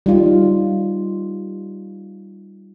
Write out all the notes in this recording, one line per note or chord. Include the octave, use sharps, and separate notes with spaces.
G3 D#4 F4